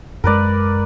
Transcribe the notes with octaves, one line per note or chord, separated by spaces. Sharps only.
F#2 G#3 A#4 B4 D5